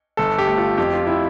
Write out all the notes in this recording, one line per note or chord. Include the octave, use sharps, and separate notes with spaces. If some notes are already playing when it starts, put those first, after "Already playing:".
G1 A4
G4
A3
F4
F2 G4
F4
E4